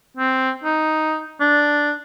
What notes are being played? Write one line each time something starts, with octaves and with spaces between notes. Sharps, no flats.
C4
D#4
D4